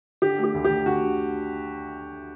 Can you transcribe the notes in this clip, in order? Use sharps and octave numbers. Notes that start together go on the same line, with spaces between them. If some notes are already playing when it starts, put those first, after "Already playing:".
D3 G4
A3
G4
D2
D2 G4
D3 F#4
D3